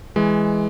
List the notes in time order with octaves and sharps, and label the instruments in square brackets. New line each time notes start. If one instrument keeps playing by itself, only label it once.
[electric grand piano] E3 G#3